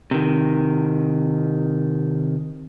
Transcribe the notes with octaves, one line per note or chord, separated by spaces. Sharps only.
C3 D#3